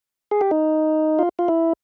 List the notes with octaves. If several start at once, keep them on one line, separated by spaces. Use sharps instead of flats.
G#4
G4
D#4
F4
F4
E4